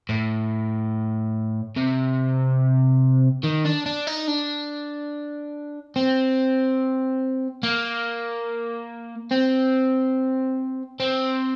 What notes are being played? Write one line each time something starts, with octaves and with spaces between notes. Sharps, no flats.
A2
C3
D#3
D4
D4
D#4
D4
C4
A#3
C4
C4